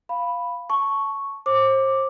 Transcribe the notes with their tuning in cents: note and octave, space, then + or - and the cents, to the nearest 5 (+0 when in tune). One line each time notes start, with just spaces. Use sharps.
F5 +0 B5 +0
A5 +0 C#6 +0
C5 +35 D6 +0